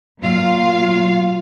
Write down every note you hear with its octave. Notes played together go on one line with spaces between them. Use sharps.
A#2 F#3 F4 F5